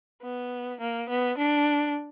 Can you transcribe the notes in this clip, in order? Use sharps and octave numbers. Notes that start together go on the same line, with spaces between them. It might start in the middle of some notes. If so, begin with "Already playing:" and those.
B3
A#3
B3
D4